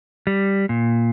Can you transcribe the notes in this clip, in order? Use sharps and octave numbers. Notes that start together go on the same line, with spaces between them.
G3
A#2